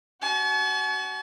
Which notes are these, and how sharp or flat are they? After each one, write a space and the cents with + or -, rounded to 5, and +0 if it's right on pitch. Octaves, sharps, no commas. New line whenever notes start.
F#4 +25 A5 -45